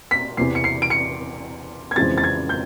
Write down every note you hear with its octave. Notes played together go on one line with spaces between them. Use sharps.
B6
E2 C3 E3 C7
C#7
C7
D7
C#7
G#6
F2 C#3 E3 G#3 C4 A6
A6
G#6
G6